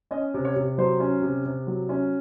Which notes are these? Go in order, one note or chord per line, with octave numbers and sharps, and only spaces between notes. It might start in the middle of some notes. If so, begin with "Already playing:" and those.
C#4 D#5
C3
C#5
C3
F#3 C5
C#4
C3
C3
F#3
C#4